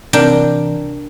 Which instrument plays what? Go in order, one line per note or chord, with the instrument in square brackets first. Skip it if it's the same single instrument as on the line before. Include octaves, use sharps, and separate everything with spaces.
[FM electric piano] C3 E3 [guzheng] D4 A#4 G5